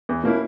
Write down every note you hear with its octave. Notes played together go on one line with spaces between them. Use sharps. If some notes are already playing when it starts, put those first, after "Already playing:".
E2
B2 A#3 C#4 E4